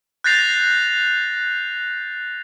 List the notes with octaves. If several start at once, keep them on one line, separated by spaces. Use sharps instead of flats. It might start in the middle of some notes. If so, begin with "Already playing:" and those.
F#6 G6 A6 A#6 C7 F7